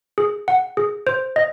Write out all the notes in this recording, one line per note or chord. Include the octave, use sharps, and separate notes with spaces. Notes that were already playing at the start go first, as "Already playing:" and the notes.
G#4
F#5
G#4
C5
D#5